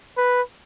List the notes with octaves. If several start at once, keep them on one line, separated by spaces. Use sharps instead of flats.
B4